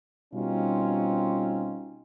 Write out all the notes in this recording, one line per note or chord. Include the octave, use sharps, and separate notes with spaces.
B2 G3 C4 C#4 D#4 F4